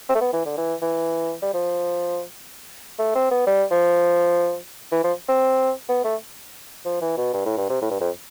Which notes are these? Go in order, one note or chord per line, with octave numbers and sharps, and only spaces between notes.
C4
A3
B3
E3
D3
E3
E3
G3
F3
A3
C4
B3
G3
F3
E3
F3
C4
B3
A3
F3
E3
B2
G2
A2
G2
C3
A2
G2
F2